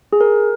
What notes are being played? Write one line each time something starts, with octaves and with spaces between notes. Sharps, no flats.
G#4
A#4